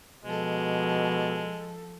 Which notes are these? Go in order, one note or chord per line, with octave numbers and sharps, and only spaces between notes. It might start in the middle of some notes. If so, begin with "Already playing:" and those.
B2 F3 G#3 A4